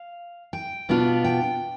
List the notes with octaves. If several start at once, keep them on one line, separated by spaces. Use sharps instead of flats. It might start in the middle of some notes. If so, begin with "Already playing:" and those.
Already playing: F5
G5
B2 B3 D4 F4
G5